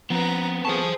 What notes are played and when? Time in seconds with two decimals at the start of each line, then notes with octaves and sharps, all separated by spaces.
0.10 F3 B3 C4 B4 A#5
0.65 G#4 A4 C5 A5 C#6